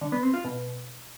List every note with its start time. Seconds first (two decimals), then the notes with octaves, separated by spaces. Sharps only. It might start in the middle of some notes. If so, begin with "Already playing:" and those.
0.01 D3
0.12 B3
0.23 C4
0.34 F4
0.44 B2